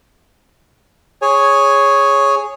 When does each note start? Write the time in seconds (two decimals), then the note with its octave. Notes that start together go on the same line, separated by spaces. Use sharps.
1.22 G#4 C#5 G#5